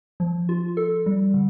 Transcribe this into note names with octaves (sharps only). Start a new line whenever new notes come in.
F3
F4
A4
G3
D3